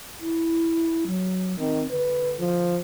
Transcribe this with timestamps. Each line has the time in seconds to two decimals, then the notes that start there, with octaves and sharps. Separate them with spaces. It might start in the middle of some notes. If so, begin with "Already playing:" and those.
0.20 E4
1.07 F#3
1.59 D#3 C4
1.92 D3 B4
2.40 F3